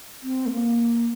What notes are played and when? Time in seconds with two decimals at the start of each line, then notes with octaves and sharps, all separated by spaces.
0.23 C4
0.46 A3
0.52 A#3